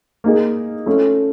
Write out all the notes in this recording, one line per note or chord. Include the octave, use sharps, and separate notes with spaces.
A#3 D#4 G#4
A3 C#4 F4